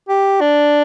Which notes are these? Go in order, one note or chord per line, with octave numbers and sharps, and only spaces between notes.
G4
D4